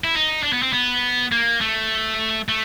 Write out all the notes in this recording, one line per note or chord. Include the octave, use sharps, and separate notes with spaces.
E4
D#4
D4
B3
C4
B3
A#3
A3
A3